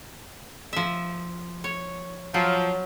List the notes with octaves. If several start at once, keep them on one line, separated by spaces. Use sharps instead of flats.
F3 E5
C#5
F3 F#3